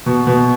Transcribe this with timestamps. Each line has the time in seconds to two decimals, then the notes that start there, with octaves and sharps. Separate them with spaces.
0.06 B2
0.27 B2